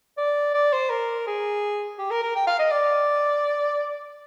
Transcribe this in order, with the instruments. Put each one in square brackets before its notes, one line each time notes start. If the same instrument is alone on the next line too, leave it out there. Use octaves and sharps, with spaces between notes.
[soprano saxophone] D5
D5
C5
A#4
G#4
G4
A#4
A#4
G5
F5
D#5
D5